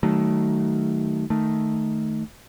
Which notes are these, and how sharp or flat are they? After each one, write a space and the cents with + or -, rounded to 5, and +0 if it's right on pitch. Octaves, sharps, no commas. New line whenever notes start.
D#3 +0 F#3 +30 A3 +0
D#3 +0 A3 +0